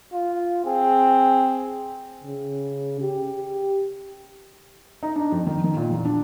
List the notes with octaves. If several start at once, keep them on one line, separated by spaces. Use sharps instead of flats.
F4
C4 G#4
C#3
G4
D#4
D4
F2
D#3
D#3
A#2
E2
D4